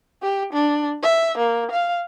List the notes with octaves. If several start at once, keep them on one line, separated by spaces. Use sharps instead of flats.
G4
D4
E5
A#3
F5